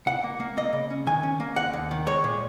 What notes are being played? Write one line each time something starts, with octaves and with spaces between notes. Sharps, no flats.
C#2 F#5
A#3
A#3
A#3 D#5
C#3
C#4
D#3 G#5
C#4
A#3
D#2 F#5
D#2
D#3
G#3 C#5
A#2